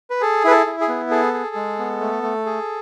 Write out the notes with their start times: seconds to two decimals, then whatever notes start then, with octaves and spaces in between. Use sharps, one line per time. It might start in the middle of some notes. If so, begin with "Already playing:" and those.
0.10 B4
0.21 G#4 A4
0.44 E4 B4
0.51 A4
0.66 E4
0.81 G#4
0.88 B3
1.11 G#4 A4
1.34 G#4
1.55 G#3
1.79 B3
2.01 A3
2.23 A3
2.46 G#4